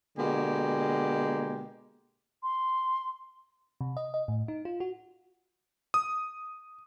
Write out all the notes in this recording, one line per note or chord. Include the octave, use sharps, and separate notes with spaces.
B2 D3 G#3 A#3 G4
C6
C3
D#5
D#5
A2
D#4
F4
F#4
D#6